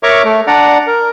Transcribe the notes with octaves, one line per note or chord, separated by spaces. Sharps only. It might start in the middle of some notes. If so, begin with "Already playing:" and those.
A#4 C#5 E5 A#5 C#6 D6
A3
D4 D5 F#5 A#5
A#4